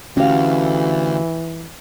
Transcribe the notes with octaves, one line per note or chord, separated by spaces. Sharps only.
D2 E3 C#4 F#4 G4 F5